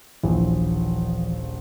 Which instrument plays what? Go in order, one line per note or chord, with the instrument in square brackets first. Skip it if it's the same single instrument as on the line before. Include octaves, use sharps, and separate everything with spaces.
[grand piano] D#1 A#1 [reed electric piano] E3 F3